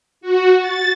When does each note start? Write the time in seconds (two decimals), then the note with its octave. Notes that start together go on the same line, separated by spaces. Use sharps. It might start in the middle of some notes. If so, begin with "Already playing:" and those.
0.21 F#4
0.59 A6